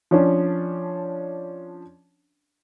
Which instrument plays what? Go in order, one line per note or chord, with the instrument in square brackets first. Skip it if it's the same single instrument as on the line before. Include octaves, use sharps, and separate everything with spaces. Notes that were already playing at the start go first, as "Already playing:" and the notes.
[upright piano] F3 C#4 D4